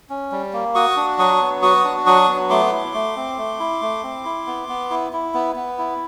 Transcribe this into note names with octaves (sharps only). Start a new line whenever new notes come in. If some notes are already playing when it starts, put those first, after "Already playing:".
C#4
G3
A#3
F#4 C#6 D#6
D4
F#3 C#6 D#6
B3
F#4 C#6 D#6
D4
F#3 C#6 D#6
B3
A3 C6 D6
E4
A3
C4
A3
E4
A3
C4
E4
B3
B3
E4
E4
B3
B3
E4